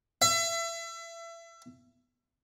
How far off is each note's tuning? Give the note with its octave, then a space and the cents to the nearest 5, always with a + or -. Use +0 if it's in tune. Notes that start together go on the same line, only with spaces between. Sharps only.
E5 +30